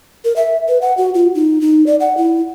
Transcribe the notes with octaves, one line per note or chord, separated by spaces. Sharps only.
A#4
E5
B4
F#5
F#4
F4
D#4
D#4
D5
F#5
E4